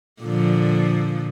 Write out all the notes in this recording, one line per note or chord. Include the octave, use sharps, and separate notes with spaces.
A#2 D3 F3